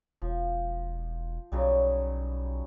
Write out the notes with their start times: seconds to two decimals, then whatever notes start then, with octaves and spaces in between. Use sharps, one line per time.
0.22 E1 F3
1.52 B1 F#2 C#3 G3